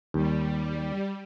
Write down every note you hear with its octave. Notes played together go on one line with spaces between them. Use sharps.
D#2 G3